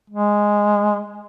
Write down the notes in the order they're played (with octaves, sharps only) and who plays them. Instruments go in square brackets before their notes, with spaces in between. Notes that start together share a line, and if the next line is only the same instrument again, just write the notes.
[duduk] G#3